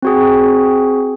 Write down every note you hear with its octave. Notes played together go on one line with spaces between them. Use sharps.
C4 F#4 G#4